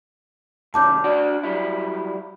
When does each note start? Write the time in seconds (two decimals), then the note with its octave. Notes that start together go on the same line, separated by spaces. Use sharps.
0.74 C2 D#3 C#4 A5 D6 G6
1.04 D4 F#4 D5
1.43 F#3 G3 E4